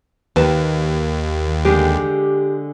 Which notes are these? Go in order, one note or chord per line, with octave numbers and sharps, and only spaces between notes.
D#2 D#3 B4 A5
D3 G#3 G4